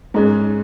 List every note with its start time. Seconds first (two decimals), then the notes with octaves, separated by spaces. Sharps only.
0.14 G#2 G#3 C#4